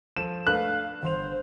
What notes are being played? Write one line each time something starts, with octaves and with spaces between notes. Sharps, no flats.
F3 A4 D#7 E7
A3 D4 B4 F5 F#6
G1 C5 C6 F7